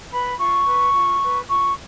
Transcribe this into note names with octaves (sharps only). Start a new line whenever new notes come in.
B4 B5
F4 C#6
B4
F4
B4
F4 C#6